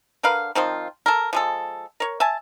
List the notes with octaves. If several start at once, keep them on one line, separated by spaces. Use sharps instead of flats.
D3 A#4 B4 F5
D#3 F3 C4 F4
A4 A#4
F3 G#3 A4
A#4 C#5
E5 G#5 A5